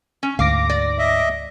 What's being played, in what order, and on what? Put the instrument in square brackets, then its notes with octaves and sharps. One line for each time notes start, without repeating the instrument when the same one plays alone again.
[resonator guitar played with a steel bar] C#4
[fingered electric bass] D2 [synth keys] G#2 D6 A#6 [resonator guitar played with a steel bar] F5
[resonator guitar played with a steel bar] D5
[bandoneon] D#5 E5